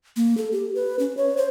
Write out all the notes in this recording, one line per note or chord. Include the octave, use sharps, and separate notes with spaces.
A#3
A4
G4
B4
C#4
C#5
C5